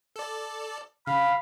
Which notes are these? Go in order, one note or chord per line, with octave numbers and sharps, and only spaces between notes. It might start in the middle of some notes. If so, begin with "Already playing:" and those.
A4 D5
C#3 F5 B5